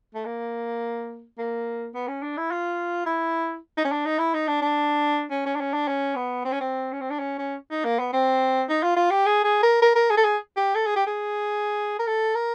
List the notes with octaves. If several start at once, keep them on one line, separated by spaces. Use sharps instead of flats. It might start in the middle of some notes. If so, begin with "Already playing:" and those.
A3
A#3
A#3
B3
C#4
D4
E4
F4
E4
D#4
C#4
D4
D#4
E4
D#4
D4
D4
C#4
C#4
D4
C#4
D4
C#4
B3
C4
C#4
C4
C#4
C4
D4
C#4
C#4
D#4
A#3
B3
C4
D#4
F4
F4
G4
G#4
G#4
A#4
A#4
A#4
G#4
A4
G#4
G4
A4
G#4
G4
G#4
A#4
A4
A#4